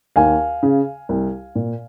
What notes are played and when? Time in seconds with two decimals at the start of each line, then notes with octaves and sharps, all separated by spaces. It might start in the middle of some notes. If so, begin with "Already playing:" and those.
0.16 D#2 F5 G#5
0.63 C#3
1.09 C2
1.55 A#2